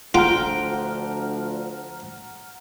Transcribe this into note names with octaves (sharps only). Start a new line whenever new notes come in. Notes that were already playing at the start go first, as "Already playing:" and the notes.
D2 F3 D4 F4 F#5 G5 A#5 F6